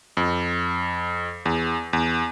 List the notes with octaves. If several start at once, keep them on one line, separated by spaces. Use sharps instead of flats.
F2
E2
E2